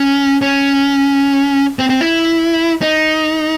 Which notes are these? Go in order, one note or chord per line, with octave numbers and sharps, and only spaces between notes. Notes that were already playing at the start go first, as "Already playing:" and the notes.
Already playing: C#4
C#4
C4
C4
E4
D#4